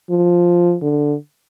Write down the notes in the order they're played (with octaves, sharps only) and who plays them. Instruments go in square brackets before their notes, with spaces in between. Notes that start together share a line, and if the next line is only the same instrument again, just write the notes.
[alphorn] F3
D3